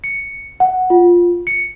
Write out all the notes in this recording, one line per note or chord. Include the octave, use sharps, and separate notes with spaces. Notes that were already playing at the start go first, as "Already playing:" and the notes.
C#7
F#5
F4
C#7